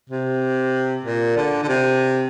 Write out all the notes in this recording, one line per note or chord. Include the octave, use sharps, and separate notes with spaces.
C3
A#2
D3
D3
C3